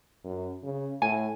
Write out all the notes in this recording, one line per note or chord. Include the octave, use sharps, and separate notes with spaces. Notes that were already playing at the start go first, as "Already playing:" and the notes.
F#2
C#3
A2 G#5